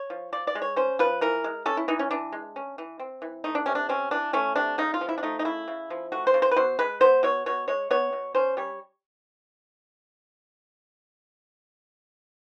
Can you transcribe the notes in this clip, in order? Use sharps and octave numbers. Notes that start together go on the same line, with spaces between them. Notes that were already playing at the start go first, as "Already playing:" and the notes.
Already playing: C#5
F3
F3 D5
D5
G#3
C#5
C#4 C5
F3 B4
E3 A#4
G#3
C#4 A4
E4
E3 D#4
C#4
E3 D4
G#3
C#4
E3
C4
E3
A3 D#4
D4
C3 C#4
D4
C4 C#4
E3 D4
A3 C#4
C3 D4
C#3 D#4
F4
F3
E4
D4
A3 D#4
D#4
C#3 E4
C#3
F3
A3 F#4
C5
C#3
C5
B4
B2 C5
G#3 B4
B3 C5
B2 C#5
B2 C#5
G#3 C#5
B3 C#5
B2
C#4 C5
G3 C#5